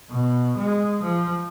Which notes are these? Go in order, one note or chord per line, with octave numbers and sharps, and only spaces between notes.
B2
G#3
F3